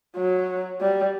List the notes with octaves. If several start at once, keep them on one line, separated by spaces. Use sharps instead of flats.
F#3
G3